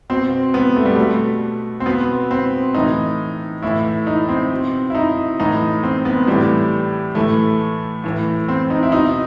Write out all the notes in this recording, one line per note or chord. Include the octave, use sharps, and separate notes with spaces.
B2 C4
B3
A3
G3
B2 A3
C4
B2 B3
C4
A2 E3 D#4
A2 E3 E4
D#4
C4
B2
E4
D#4
A2 E3 D#4
C4
B3
A2 E3 G3
A2 E3 A3
A2 E3
C4
D#4
E4
B2 D#4